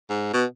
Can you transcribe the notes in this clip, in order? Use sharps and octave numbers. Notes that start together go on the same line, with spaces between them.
G#2
B2